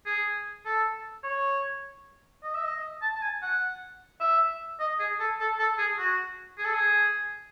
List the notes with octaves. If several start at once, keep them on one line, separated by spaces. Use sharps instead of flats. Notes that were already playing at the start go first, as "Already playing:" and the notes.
G#4
A4
C#5
D#5
E5
D#5
A5
A5
G#5
F#5
E5
D#5
G#4
A4
A4
A4
G#4
F#4
G#4
A4
G#4